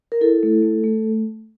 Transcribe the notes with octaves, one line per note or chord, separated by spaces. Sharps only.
A#4
E4 A4
A3
A3
A3